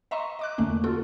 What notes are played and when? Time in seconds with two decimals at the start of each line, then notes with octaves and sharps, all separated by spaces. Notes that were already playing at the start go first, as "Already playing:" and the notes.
0.11 D#5 E5 A#5 C6 C#6
0.39 D#5 D6 F#6
0.58 E2 D3 A3 A#3 C#4
0.84 F4 F#4 A4